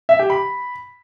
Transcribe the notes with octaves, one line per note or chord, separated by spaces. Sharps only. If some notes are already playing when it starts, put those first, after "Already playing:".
E5
G4
B5